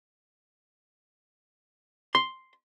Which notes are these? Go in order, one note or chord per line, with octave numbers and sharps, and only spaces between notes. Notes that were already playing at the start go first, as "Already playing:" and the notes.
C6